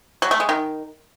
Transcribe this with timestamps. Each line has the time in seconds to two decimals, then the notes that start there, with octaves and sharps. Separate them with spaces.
0.22 F#3
0.31 A3
0.40 G#3
0.49 D#3